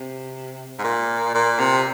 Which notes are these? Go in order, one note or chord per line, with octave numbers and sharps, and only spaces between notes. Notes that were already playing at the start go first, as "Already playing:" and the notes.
Already playing: C3
G#2
A#2
A#2
C3